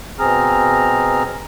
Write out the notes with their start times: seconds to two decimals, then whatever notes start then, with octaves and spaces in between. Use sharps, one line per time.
0.19 B2 C4 G#4 A#5 F6